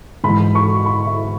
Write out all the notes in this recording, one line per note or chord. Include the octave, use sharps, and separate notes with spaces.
G#2 E3 B5
C#6
B5
E5